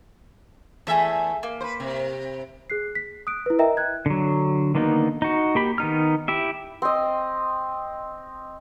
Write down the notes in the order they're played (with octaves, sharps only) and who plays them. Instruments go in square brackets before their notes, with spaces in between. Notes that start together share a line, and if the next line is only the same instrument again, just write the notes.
[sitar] E2 A3 E5 [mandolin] G#4 A4
[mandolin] A#3
[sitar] B4 C5
C3
[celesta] G#4 F#6 C7
B6
D#6 F#6 D7
E4 B4
A#4 D#5 E5 G5 A#5
F#6 G#6
[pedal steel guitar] D3 F#3
D3 D#3 A#3 B3 D#4
D#4 F#4
A#3 G4 B5
D#3 B3 D#4 F6
E4 G4 E5
[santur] C4 D#5